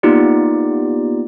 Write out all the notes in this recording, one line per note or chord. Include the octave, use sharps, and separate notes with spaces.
A#3 B3 D#4 F4 G4 D5